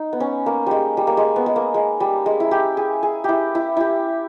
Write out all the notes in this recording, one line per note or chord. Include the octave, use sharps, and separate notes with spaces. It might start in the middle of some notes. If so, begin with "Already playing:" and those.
Already playing: D#4
B3
C#4
A#3
G3 G#3
G3
A#3
G#3
B3
G#3
A#3
G#3
G3
G#3
E4
G4
G#4
G#4
E4 G4
E4
E4 G4